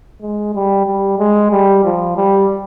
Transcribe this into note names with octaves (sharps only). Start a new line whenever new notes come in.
G#3
G3
G3
G#3
G3
F3
G3